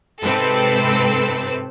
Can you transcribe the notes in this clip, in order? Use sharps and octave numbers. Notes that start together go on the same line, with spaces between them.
G#2 C3 C4 A4 B4 E6